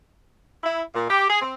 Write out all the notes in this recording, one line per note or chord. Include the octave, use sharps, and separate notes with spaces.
E4
A#2
G4
G#4
C4